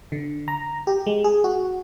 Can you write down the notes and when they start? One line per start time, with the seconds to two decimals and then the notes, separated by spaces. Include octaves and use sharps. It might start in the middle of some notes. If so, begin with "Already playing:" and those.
0.12 D3
0.48 A#5
0.87 G4
1.06 G#3
1.24 G#4
1.44 F#4